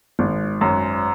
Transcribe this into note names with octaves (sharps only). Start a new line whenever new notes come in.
G#1
F#2